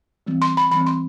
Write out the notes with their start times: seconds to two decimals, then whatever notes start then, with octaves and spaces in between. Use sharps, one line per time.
0.27 E3 G3 C4
0.42 C6
0.57 B5
0.71 E3 G3 C4 B5
0.86 C6